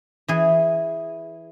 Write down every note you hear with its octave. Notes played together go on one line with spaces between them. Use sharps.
E3 G#4